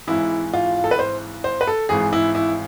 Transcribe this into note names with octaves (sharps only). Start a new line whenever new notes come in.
G#1 G#2 E3 E4
F4
A4
B4
C5
C5
B4
A4
G#1 G#2 E3 G#4
E4
E4